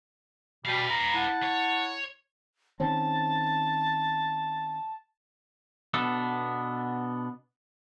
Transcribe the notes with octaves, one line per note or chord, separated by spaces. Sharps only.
B2 G3 B4 F5
A#5
E4 F#5 A5
C#5
D#3 C4 C#4 A5
B2 B3 D4 A4